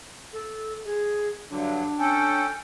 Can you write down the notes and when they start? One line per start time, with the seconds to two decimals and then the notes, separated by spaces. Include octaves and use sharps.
0.33 A4
0.85 G#4
1.50 G2 D3 F#3 D4
1.99 C#4 A4 G5